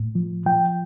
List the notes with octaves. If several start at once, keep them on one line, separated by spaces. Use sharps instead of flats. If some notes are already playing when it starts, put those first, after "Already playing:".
Already playing: A2
F3
F3 G5